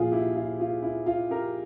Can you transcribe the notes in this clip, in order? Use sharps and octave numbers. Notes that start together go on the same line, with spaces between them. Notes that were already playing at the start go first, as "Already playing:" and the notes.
Already playing: A#2 F3 F4 G#4
E4 G4
F4
F4
E4
F4
G4 A#4